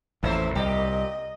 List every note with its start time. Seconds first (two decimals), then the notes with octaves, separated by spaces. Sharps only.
0.23 A1 F2 A#2 A3 E4 C5
0.55 C2 A#2 G4 D#5